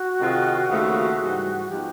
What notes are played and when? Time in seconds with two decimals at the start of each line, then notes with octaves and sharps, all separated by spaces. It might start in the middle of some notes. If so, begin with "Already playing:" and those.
Already playing: F#4
0.21 C3 D#3 G#3 C4 F4
0.71 D#2 C#3 F3 A3
1.20 G#2 E3 G3
1.69 F3 G#3 B3 D#4 G4